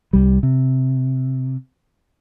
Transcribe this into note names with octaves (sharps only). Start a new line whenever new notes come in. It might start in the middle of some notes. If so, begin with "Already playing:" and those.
C2 G3
C3